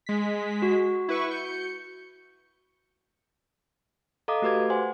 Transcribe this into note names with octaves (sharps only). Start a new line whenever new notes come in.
G#3 B6
F#4
E4 B4 C#6
G6 C#7
A4 D#5 F5 A#5 D6 D#6
A3 F#4 G4 B4 D6 G#6
C5 F#5 G#5 C6